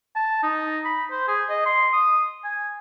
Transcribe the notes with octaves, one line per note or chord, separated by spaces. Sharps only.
A5
D#4
B5
C5
G#4
D#5
C6
D#6
G#5